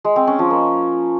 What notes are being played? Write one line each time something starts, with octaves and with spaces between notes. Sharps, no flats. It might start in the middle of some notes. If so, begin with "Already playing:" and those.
G#3
C4
C#4
F3
A#3